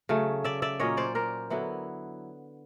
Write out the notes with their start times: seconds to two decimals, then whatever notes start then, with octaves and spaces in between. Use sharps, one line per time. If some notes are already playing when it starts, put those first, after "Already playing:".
0.09 C#3 F#3 A3
0.44 D5 E5
0.62 D5 E5
0.80 A#2 F#3 A#3 C#4 C#5 D#5
0.97 C5 D5
1.15 A#4 C5
1.50 D3 F#3 B3 E4